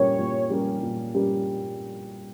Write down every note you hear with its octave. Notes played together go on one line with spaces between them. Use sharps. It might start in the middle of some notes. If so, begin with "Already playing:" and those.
Already playing: A#2 G3 C#4 G4 A#4 C#5
A#2
G3 C#4 G4 A#4
A#2
G3 C#4 G4 A#4